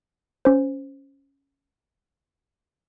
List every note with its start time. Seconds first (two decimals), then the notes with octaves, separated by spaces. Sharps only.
0.45 C#4 C5